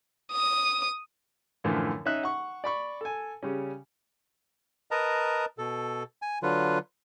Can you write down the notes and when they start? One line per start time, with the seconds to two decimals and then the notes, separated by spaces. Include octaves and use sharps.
0.32 D#6
1.64 F#2 A2 D3 E3 F3
2.06 C#4 D#4 E5 F#6
2.23 F#5 C#6
2.64 D5 B5 C#6
3.01 A4 G#5
3.43 C#3 G3 C#4
4.91 A#4 B4 D#5 A5 A#5
5.58 B2 A4
6.22 G#5
6.43 D3 F#3 F4 B4